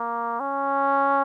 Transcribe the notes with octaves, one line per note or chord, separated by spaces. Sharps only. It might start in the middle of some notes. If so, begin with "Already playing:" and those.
Already playing: A#3
C#4